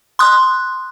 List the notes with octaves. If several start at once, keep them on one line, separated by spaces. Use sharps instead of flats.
C6 D#6 F#6